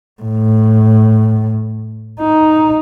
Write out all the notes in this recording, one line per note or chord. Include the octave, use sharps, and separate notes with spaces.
A2
D#4